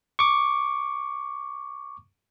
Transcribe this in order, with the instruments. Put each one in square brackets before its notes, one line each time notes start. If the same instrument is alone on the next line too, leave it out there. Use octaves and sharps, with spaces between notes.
[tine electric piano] C#6 D6